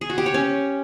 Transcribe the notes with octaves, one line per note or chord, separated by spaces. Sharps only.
G#4
F#4
G4
C#5
C#4